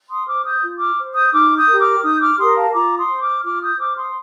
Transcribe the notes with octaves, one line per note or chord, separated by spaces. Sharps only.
C6 D#6
C5 D6 F6
D#6 G6
F4
D6 F6
C5
D#6 G6
D#4 D6 F6
D#6 G6
G4 A#4
D6 F6
D#4 D#6 G6
D6 F6
G4 A#4 C6 D#6
F5 A5
F4 A#5 D6
C6 D#6
C5
D6 F6
F4 D6 F6
D#6 G6
C5 D6 F6
C6 D#6